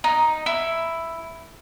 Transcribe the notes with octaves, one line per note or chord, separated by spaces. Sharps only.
D#4
E4